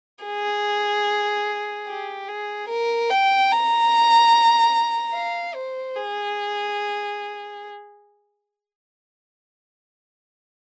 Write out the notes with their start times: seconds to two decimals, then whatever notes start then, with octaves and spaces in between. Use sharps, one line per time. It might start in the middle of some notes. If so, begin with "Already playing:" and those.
0.25 G#4
1.87 G4
2.28 G#4
2.69 A#4
3.10 G5
3.51 A#5
5.14 F5
5.54 C5
5.96 G#4